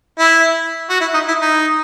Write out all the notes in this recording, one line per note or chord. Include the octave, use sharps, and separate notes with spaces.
E4
F#4
E4
D#4
E4
D#4